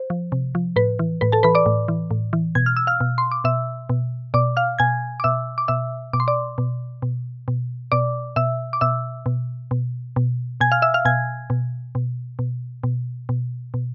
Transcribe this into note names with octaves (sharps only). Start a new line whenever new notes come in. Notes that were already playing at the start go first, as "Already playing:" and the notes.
Already playing: C5
F3
C3
F3
A2 B4
E3
A2 B4
A4 A5
E3 B4 B5
D5 D6
A2
E3
A2
E3
B2 G#6
F6
E6
F5 F6
B2
C6
D6
B2 E5 E6
B2
B2 D5 D6
F5 F6
B2 G#5 G#6
D6
B2 E5 E6
D6
B2 E5 E6
B2 D6
C6
D5 D6
B2
B2
B2
B2 D5 D6
B2 E5 E6
D6
B2 E5 E6
B2
B2
B2
B2 G#5 G#6
F5 F6
E5 E6
F5 F6
B2 G#5 G#6
B2
B2
B2
B2
B2
B2